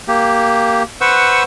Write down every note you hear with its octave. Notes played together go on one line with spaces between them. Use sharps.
A#3 G4
B4 C5 F#5 C#6 E6